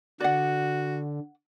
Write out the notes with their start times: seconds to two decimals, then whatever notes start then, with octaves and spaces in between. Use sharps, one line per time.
0.21 D3 F#4 D5 F#5